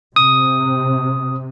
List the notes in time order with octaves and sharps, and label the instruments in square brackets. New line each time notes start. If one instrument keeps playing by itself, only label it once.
[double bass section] C3 [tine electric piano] D#6